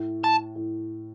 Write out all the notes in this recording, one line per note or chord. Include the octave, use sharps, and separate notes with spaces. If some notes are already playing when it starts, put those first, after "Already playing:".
Already playing: A2
A5
A2